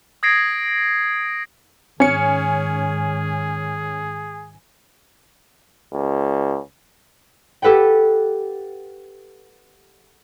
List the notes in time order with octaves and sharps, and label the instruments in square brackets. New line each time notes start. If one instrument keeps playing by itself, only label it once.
[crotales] D#6 G#6 A#6 C7 D7
[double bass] G#2 D#3 [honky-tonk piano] C#4 [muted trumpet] G#4 [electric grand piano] G#5 C#7
[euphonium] C#2
[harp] G4 A4 B4 F#5 G5